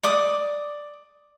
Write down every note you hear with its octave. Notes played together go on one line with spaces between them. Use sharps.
D5 D6 D#6